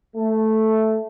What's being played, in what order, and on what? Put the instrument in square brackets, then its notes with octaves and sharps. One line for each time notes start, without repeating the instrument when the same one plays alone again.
[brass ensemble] A3